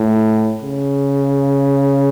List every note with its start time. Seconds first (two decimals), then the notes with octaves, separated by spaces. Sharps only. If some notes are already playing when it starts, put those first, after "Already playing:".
Already playing: A2
0.62 C#3